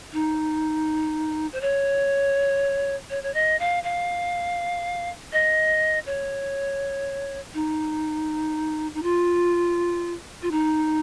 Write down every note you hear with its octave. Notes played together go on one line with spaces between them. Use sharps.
D#4
C5
C#5
C#5
C#5
D#5
F5
F5
D#5
C#5
D#4
D#4
F4
F4
D#4